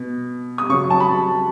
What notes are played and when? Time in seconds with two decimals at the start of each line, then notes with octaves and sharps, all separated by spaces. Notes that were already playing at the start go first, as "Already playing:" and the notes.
Already playing: B2
0.58 D#6
0.69 C#3 F#3 C#6
0.90 A5
1.00 B5